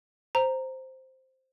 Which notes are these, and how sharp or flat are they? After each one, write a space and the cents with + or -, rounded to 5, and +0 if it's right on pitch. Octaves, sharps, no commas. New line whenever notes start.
C5 +0 A#5 -5